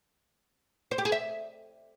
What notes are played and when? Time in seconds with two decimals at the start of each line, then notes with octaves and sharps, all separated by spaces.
0.91 C5
0.98 G4
1.05 G#4
1.12 E5